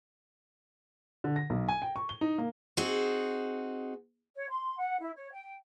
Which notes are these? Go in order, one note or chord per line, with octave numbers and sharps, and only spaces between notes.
D3
A#6
B1
G#5
G5
C#6
G7
D#4
A#3
C4 D#4 F#4 G#4
C#5
C6
F#5
E4
C#5
G5